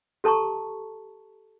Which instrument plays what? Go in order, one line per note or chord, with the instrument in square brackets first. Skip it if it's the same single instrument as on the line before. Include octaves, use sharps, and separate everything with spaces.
[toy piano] G4 A4 A5 A#5 C#6